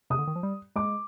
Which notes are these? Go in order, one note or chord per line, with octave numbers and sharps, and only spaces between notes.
C3 D#6
D3
D#3
F3
G3
G#3 D6